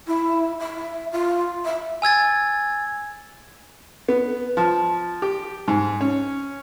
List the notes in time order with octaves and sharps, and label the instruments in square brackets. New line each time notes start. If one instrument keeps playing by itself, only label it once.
[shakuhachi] E4
E5
F4
E5
[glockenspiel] G#5 E6 G#6 A6
[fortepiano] B3
F3
G4
G#2
C#4